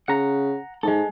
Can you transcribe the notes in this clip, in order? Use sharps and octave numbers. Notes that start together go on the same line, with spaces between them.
C#3 F#5 A#5
G#2 G#3 A4